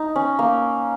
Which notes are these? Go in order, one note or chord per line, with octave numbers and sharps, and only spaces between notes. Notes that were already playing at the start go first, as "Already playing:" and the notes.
Already playing: D#4
C#4
A#3